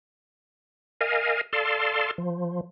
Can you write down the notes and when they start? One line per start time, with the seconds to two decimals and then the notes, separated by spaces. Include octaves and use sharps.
1.01 A#4 D#5 F5 G#5
1.53 A4 D5 F5 A5 C6
2.18 F3